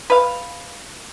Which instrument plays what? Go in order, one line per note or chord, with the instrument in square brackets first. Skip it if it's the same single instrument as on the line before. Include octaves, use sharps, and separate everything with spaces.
[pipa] B4 F5